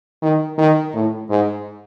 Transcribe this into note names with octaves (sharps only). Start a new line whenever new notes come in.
D#3
D#3
A2
G#2